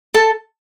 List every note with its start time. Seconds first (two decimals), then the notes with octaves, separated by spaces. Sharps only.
0.14 A4 A5